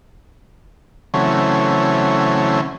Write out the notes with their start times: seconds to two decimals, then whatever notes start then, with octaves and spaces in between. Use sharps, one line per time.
1.14 C#3 E3 F#3 A3 C4 C#4